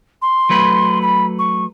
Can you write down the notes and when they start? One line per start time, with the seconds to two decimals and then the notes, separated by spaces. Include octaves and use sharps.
0.22 C6
0.50 F#3 A3 B4
1.01 B5
1.39 C#6